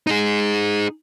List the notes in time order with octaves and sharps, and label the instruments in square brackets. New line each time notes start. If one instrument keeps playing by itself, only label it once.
[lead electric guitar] D#4 G#4